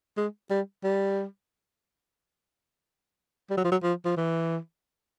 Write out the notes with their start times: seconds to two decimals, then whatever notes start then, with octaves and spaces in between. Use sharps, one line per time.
0.17 G#3
0.51 G3
0.84 G3
3.50 G3
3.57 F#3
3.65 F3
3.71 F#3
3.83 F3
4.05 F3
4.17 E3